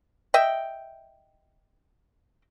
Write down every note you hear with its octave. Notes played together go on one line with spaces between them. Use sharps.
D#5 E5 G5